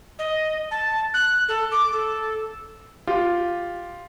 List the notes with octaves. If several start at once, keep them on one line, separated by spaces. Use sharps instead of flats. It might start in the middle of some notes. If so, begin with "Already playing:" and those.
D#5
A5
F#6
A4
D6
A4
F4 G4